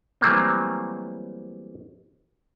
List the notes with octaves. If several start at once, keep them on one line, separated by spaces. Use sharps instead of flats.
E3 F#3 G3 A3 A#3 C4